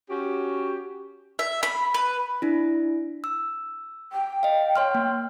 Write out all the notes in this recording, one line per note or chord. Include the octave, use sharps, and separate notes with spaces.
C#4 F#4 G4
E5
B5
B4
D4 E4
E6
G5
D#5 F5
C#5 C6 F6
A#3